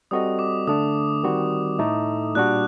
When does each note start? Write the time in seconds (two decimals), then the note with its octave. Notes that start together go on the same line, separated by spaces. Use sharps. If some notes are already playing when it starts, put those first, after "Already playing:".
0.11 G3 C4 F#4 A4 D#5 D#6
0.39 D6
0.68 D3 A3 D4 D#6
1.23 D#3 G3 C4 F#4
1.79 A2 A3 D#4 A4
2.35 A#2 G3 D4 F#4 F#6